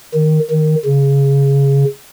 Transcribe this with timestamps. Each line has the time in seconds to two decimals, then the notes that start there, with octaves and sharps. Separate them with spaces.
0.14 D#3
0.50 D#3
0.86 C#3